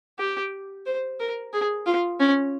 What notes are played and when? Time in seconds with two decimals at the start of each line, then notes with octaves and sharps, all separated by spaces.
0.19 G4
0.86 C5
1.20 A#4
1.53 G#4
1.86 F4
2.20 C#4